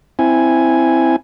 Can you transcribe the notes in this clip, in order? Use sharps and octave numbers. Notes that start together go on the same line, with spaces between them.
C4 E4 G#5